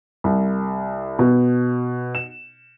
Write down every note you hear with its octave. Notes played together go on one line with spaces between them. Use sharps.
C2
B2
E7